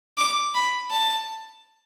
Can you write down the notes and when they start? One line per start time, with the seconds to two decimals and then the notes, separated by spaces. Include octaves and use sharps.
0.18 D6
0.54 B5
0.91 A5